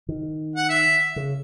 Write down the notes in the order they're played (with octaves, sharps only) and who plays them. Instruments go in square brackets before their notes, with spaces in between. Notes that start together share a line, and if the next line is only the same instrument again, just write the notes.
[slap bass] D#3
[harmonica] F#5
E5
[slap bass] C#3